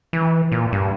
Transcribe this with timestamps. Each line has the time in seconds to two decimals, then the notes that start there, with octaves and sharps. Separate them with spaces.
0.13 E3
0.52 A#2
0.72 G2